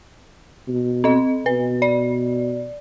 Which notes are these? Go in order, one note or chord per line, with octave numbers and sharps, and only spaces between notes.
B2
C4 D#5
B2 B4
D5